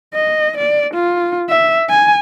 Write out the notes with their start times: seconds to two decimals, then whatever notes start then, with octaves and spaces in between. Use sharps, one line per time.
0.15 D#5
0.58 D5
0.94 F4
1.49 E5
1.90 G#5